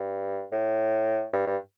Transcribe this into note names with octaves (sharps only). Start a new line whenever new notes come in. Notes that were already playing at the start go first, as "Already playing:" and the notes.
Already playing: G2
A2
G2
G2